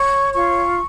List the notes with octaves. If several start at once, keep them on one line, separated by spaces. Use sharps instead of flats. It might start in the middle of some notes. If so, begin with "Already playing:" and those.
Already playing: C#5 C#6
F4 C#6